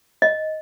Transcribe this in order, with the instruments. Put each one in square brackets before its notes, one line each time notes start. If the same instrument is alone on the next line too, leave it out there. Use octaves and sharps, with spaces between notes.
[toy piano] D#5